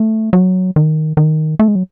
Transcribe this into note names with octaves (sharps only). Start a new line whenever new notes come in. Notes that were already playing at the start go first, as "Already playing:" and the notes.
Already playing: A3
F#3
D#3
D#3
A3
G#3
F#3